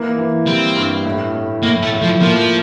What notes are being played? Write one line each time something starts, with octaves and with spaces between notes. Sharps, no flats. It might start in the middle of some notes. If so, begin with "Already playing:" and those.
Already playing: E3 A#3
E3
G3 C4
G2
A2
A2
A2 A#3
A3
A2
F3
F3 A#3